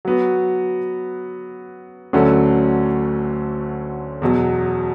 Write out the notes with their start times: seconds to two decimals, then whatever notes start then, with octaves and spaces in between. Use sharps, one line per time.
0.05 F#3 B3 F#4
2.13 D2 D3 F#3 A3 C#4
4.22 E2 B2 F#3